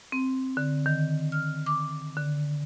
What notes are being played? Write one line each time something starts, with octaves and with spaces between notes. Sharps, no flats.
C4
D3
D#3
F6
D6
D3